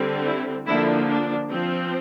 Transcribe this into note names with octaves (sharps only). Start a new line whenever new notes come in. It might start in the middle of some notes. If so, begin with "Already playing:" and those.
Already playing: D3 G3 C4
E4
D3 F3 A#3 D4 E4
D4
F3 C4